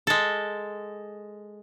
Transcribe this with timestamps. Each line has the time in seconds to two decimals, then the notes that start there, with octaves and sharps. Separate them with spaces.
0.07 G#3 A4